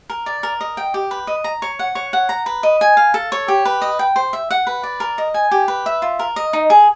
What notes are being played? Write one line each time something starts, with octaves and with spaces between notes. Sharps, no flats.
A#4
D5
A#4
D#5
G5
G4
B4
D#5
A#5
C#5
F#5
C#5
F#5
A#5
B4
D#5
G#5
F5
A4
C#5
G4
B4
D#5
G5
C5
E5
F#5
B4
D5
A#4
D#5
G#5
G4
B4
E5
F4
A#4
D#5
D#4
G#4